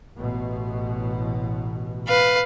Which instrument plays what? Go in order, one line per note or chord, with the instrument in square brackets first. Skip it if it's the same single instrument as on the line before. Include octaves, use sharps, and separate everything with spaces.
[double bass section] A1 B2
[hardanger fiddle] B4 F5